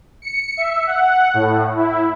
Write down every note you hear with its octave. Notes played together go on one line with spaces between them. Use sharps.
C#7
E5
F#5
A2
E4